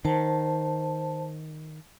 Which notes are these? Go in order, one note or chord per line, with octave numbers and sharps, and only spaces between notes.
D#3 C5 A5